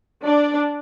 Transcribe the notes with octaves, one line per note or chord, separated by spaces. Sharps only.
D4 D5